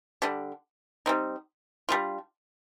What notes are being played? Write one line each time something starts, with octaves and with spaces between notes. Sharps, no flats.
D3 G3 D4
G3 C4 D#4
G3 D4 F4